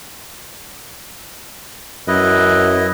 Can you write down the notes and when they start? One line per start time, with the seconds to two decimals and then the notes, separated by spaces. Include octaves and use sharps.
2.08 F#2 E4 B4 D#5